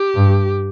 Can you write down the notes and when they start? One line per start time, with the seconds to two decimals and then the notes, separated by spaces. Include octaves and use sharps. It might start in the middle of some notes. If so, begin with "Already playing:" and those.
Already playing: G4
0.16 G2